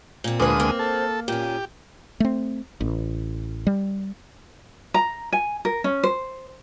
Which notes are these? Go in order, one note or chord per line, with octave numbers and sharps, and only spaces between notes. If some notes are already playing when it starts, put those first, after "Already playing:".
A#2 C4
D2 G#3 A#3 B4 D#6
A#3 C4
A4
A#2 C#4 G4
A3 C4
A1
G3
A#5
G#5
A#4
C#4
C5